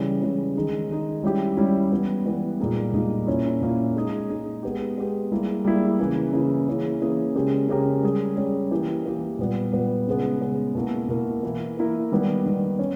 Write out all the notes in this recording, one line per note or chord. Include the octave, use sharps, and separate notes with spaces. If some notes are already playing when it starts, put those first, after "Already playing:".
Already playing: C#3 E3 G3 C#4
C#3 E3 G3 C#4
D#3 G#3 D#4 G#4
D#3 G#3 D#4 G#4
G3 C#4 E4 G4
G3 C#4 E4 G4
E3 G3 B3
E3 G3 B3
A#2 G3 A#3 D#4 G#4
A#2 G3 A#3 D#4 G#4
A#2 A#3 C#4 E4
A#2 A#3 C#4 E4
G#3 D#4 G#4
G#3 D#4 G#4
G#3 B3 G4
G#3 B3 G4
G3 A#3 E4 G#4
G3 A#3 E4 G#4
C#3 E3 A#3 E4
C#3 E3 A#3 E4
E3 A#3 C#4 E4 G#4
E3 A#3 C#4 E4 G#4
C#3 G#3 C#4 G4 A#4
C#3 G#3 C#4 G4 A#4
G3 C#4 G#4
G3 C#4 G#4
E3 A#3 E4 G4 A#4
E3 A#3 E4 G4 A#4
A#2 G3 B3
A#2 G3 B3
C#3 G#3 B3
C#3 G#3 B3
B2 A#3 E4 A#4
B2 A#3 E4 A#4
E3 A#3 E4 A#4
E3 A#3 E4 A#4
D#3 G3 B3
D#3 G3 B3
C#4